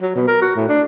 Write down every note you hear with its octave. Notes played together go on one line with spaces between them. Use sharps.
F#3
B2
A#4
F#4
A2
D4